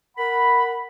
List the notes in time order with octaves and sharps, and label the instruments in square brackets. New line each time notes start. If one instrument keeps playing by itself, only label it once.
[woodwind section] A#4 F#5 B5